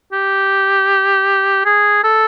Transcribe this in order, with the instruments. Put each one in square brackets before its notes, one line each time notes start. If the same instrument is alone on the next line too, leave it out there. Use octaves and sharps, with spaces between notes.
[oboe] G4
G#4
A4